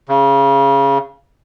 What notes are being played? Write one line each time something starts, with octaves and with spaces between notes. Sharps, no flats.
C#3